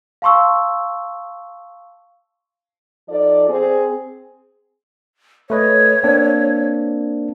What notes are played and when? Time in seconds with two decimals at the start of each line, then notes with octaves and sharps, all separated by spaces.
0.22 F5 A5 C6 C#6 E6
3.09 F3 D#4 A4 D5
3.49 C4 G#4
5.50 A3 B4 C#5 D#5
6.03 A#3 C4 D4